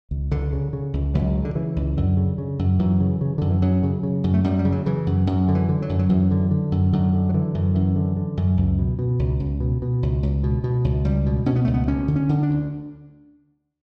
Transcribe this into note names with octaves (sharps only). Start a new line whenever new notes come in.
C#2
C#2 D3
C#3
C#3
C#2
C#2 F#3
C#3
D3
C#3 E3
C#2
F#2 D3
C#3
C#3
F#2
F#2 E3
C#3
C#3
F#2 D3
E3
F#2 F#3
C#3
C#3
F#2
A3
F#2 G3
G3
C#3
F#3
C#3 E3
F#2
F#2
D3
E3
D3
F#3
F#2
F#3
F#2 E3
D3
D3
F#2
F#2 D3
D3
F#3
D3 E3
F#2
F#2 E3
D3
D3
F#2
C#2
B2
B2
C#2
C#2
B2
B2
C#2
C#2
B2
B2
C#2
C#2 G3
B2
B2 C#4
B3
C#2 A3
B3
D2 C#4
D3
C#4
D3
D4
D2